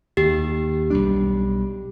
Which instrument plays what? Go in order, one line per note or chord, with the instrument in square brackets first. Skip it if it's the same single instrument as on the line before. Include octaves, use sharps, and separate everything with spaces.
[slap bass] D#2 [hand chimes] G4
[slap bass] B1 G3 D4